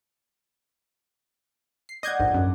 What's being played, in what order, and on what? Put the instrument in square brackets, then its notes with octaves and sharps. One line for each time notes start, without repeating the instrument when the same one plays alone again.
[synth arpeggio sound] C7
[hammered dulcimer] D5 F#5 [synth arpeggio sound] D#5 G6 G#6
[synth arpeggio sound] A#1 G#2 [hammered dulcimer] A4
[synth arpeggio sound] F#2